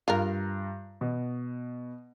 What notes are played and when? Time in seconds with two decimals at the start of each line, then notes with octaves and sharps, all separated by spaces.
0.08 G2 F4 A#4 A#5
1.01 B2